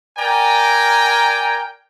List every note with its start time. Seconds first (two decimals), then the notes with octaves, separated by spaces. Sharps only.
0.17 A#4 D5 G5 G#5 A#5